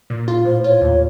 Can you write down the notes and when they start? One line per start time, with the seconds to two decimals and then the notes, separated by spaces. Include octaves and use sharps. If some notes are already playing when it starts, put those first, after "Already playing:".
0.10 A#2
0.28 F4
0.45 A2 C5
0.64 F4 C#5
0.82 D#2